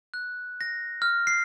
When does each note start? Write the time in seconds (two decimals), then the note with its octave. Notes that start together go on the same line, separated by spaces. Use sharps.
0.14 F#6
0.61 A#6
1.02 F6
1.27 C7